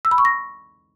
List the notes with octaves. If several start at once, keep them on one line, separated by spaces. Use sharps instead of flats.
E6
B5
C#6
A#6